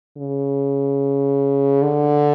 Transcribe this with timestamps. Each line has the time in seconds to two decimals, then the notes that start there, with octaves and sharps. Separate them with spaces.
0.17 C#3
1.82 D3